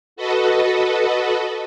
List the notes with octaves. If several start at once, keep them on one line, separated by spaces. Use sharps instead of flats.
F#4 A4 B4 D#5